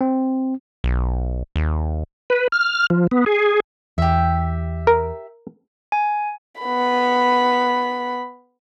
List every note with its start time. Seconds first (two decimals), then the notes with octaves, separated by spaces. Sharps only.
0.01 C4
0.84 B1
1.56 D#2
2.30 B4
2.52 F6
2.90 F3
3.11 B3
3.26 G#4
3.98 E2 G4 E5
4.87 A#4
5.92 G#5
6.61 B3 B5